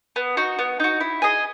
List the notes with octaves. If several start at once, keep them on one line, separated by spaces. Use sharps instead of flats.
B3
D#4 F#4
B3
D#4 F#4
E4
G#4 D#5 G#5